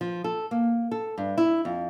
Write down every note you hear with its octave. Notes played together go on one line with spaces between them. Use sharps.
F3
A4
A#3
A4
G2
E4
F2